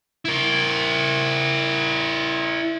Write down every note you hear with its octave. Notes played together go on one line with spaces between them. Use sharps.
E4 A#4